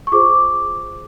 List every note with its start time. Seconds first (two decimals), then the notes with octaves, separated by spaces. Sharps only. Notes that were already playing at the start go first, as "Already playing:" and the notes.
0.07 C#6
0.12 F4 G#4 C5 D6